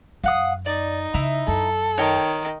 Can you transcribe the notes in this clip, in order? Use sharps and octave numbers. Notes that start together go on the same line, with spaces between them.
F#2 F5 F#5 D#6
D#4 D5
C#3 E4 A#5
F#2 A4
D#3 C#5 G5